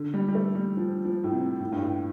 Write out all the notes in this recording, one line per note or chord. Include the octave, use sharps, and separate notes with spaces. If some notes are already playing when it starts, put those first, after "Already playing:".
Already playing: D3
G3
G3
A3
G3
F3
F3
A2
C3
A2
G2
A2